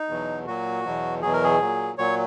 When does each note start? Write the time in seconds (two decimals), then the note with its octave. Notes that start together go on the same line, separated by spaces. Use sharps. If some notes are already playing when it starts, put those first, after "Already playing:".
Already playing: D#4
0.08 E2 B2 F#3
0.47 A#2 F#3 F#4
0.84 E2 B2 F#3
1.22 E2 B2 F#3 G#4
1.33 A#4
1.44 G#4
1.60 A#2 F#3
1.98 A#2 F#3 C#5